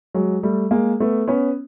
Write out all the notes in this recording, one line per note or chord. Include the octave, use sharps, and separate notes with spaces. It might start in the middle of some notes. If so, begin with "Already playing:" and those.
F#3 G#3
G3 A3
G#3 A#3
A3 B3
B3 C#4